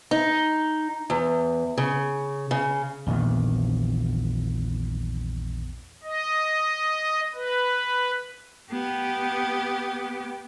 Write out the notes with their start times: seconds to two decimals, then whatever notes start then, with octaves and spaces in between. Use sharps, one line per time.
0.11 D#4
1.10 E2
1.78 C#3
2.51 C#3
3.07 A#1 E2 A#2 D#3
6.04 D#5
7.35 B4
8.72 B3 G4